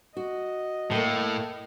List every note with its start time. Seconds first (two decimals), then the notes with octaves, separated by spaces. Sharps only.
0.17 F#4 D#5
0.91 A2 A3 A#3